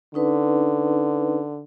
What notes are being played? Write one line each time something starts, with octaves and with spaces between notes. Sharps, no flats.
D3 C#4 D#4 B4